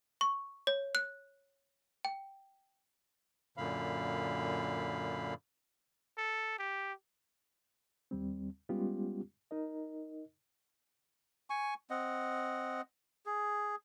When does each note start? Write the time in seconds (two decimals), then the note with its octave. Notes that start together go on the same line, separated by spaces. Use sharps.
0.21 C#6
0.67 C#5
0.95 F#6
2.05 G5
3.57 F#2 A#2 D3 F5 B5
6.18 A4
6.59 G4
8.11 D#2 G3 C4
8.69 G3 G#3 B3 C#4 F4 G4
9.51 D#4 A#4 D#5
11.50 G#5 C#6
11.90 C4 D#5 F#5
13.26 G#4